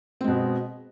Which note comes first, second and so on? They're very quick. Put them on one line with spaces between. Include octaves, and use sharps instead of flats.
C4 G#3 B2